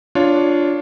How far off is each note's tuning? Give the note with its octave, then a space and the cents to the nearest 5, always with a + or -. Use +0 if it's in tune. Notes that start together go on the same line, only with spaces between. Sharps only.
D4 +0 F4 +0 C#5 +10